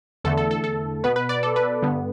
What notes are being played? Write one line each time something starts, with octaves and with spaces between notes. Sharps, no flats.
E2 D3 A3 A4
A4
A4
A4
B2 B3 B4
B4
D5
A4
B4
G2 D3 B3